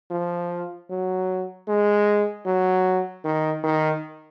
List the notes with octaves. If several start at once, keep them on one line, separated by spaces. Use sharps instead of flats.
F3
F#3
G#3
F#3
D#3
D#3